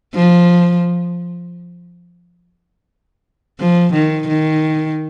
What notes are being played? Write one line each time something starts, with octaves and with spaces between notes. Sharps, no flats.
F3
F3
D#3
D#3